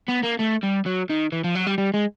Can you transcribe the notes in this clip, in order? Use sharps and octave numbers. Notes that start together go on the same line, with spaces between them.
B3
A#3
A3
G3
F#3
D#3
E3
F3
F#3
G3
G3
G#3